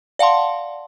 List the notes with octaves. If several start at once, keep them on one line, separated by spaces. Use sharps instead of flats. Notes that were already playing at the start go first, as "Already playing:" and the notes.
D5 F5 F#5 A5 C6